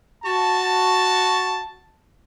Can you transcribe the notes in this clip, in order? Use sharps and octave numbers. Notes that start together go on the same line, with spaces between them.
F#4 A5